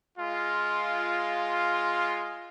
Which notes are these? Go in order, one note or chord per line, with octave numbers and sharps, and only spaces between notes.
G#3 F4